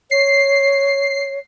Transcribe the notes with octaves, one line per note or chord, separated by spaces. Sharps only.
C#5 C7